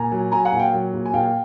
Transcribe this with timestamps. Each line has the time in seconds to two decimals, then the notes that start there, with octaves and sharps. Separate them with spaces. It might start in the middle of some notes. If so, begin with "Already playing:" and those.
Already playing: A#2 G#5 A#5
0.12 F#3
0.32 F#3 G#5 A#5
0.45 F#5 G#5
0.52 A#2
0.59 F5 G5
0.74 F#3
0.94 A#2
1.06 G#5
1.14 A#2 F5 G5